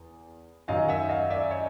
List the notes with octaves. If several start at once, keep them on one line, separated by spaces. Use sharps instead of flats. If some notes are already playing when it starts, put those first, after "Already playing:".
Already playing: E2
F#2 D#3 F#3 D#5 F5
E5 F#5
D#5 F5
D5 E5
C#5 D#5